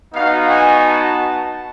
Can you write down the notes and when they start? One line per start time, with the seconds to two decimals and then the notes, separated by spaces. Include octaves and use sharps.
0.13 B3 D#4 F#4 F5
0.50 G#5
0.86 A5